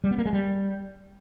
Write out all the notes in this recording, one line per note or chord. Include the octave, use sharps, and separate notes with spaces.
G3
B3
A#3
G#3
G3